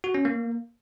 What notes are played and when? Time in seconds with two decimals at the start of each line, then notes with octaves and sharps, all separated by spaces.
0.04 F#4
0.14 C#4
0.25 A#3